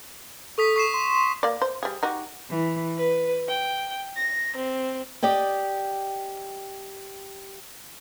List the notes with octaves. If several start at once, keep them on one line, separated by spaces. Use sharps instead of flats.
A4 C#6 D#6 B6
C#6 C7 E7
C6
A#3 D5
C5
G3 G#4
D#4 F#4 G4
E3
B4
G5
A#6
C4
G4 D5 D#5 G5